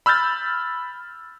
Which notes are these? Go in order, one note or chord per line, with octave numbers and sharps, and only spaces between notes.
B5 E6 F6 G6 A6